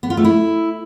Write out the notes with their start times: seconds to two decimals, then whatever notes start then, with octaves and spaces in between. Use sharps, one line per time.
0.03 B3
0.10 F4
0.17 A3
0.24 E4